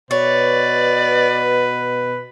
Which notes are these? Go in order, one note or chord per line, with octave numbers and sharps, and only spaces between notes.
B2 B4 C#5 D5